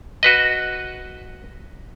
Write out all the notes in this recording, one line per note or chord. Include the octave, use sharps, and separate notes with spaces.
F#4 B4 D#5